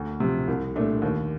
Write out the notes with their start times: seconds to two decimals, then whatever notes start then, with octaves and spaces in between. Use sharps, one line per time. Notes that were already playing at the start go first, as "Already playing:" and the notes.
Already playing: D2
0.20 C3 F3
0.48 C2
0.75 A#2 A3 D4
1.02 D#2